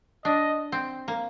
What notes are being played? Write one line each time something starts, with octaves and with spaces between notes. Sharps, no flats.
D4 D#5
C4
A#3